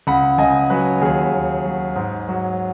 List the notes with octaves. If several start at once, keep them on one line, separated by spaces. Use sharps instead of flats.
C#2 F#5 B5
C#2 D#5 G#5
F#3 B4
D#2 G#4
D#2
F#3
G#2
F#3